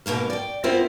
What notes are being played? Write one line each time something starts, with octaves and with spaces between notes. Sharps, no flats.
G#2 B2 A#3 A#4
D5 G5
B3 C4 E4 F4 A#4 C5